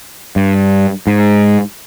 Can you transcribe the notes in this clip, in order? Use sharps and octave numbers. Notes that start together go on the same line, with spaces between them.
G2
G#2